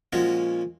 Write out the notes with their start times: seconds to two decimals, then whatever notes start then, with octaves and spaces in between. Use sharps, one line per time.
0.13 A#2 F3 G#3 C#4 F#4